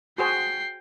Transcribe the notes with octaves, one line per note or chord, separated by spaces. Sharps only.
F#4 G#4 C5 G5 C7